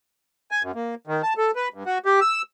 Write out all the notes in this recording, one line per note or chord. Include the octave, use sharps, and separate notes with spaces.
G#5
F#2
A#3
D#3
A5
A4
B4
G2
F#4
G4
E6